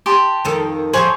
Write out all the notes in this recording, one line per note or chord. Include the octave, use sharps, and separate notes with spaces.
G4 A5 C6
F2 D#3 A4
F2 F3 G#4 C5 C#5